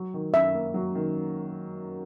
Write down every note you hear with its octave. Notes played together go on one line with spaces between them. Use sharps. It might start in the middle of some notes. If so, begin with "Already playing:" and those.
Already playing: F#3
D#3
F#2 E5
A#3
F#3
D#3